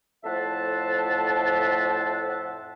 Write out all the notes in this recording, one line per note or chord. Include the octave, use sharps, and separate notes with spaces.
F2 A2 C5 E5 F#5 A5